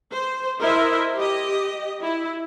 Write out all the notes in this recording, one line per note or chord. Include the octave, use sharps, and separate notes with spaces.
C5
E4 A#4 C5 D#5 E5
G4 D#5
E4